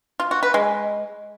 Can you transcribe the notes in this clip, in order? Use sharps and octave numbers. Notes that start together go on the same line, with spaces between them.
F4
F#4
B4
G#3